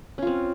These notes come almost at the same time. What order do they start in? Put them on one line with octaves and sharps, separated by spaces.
C#4 F4 C4